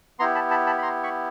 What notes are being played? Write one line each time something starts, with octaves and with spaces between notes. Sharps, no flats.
B3 E4 G4 A#5 C6
A5 B5
A5 B5
A5 B5
B5
A#5 C6
B5 C#6